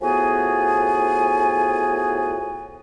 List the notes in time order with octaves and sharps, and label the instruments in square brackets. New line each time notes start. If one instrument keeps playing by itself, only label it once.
[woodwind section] A2 F3 B3 F#4 G#4 G#5